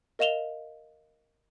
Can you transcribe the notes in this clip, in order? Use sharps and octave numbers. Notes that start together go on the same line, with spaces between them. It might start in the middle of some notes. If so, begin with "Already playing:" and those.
A#4 D#5 F5 E7 F7 G7